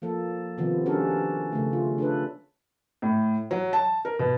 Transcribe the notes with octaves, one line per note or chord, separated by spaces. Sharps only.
F3 A#3 A4
C3 D#3 F3 B3
G3 C#4 D4 F#4 A4 A#4
C#3 A3
F4
D4 A4 B4
A2
F#3
A5
A#4
B2